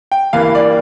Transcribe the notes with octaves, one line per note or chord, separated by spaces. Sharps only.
G5
G2 E3 A#3 F5
D5